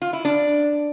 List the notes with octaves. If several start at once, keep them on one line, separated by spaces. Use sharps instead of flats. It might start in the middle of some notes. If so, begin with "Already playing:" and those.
F4
E4
D4